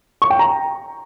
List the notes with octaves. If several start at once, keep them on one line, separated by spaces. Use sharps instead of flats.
C#6
G5
A#5